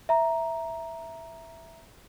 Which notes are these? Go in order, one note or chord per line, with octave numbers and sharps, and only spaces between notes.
E5 A#5